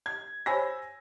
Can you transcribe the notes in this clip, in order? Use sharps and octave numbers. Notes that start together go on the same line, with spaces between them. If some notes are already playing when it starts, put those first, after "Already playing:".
G#6
C5 C#5 G#5 B5 E6 A#6